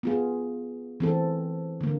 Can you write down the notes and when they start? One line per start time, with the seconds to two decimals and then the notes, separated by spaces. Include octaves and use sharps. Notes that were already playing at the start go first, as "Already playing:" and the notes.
0.03 B3 F4 G#4
1.00 E3 C4 A4
1.81 D3 A#3